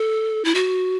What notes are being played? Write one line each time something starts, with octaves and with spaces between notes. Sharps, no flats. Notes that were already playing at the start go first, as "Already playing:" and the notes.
Already playing: A4
E4
F#4